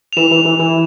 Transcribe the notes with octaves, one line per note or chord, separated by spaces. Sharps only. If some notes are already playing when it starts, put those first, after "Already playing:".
F7
E3 E7
E3
E3
E3